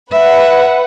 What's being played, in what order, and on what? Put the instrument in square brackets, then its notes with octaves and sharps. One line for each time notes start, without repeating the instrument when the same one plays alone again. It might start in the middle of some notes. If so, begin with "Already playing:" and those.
[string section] B4 F#5 [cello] E5